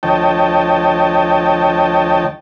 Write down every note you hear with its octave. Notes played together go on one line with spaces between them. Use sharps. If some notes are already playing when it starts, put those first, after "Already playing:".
D2 F3 C#5 D#5 G5 A5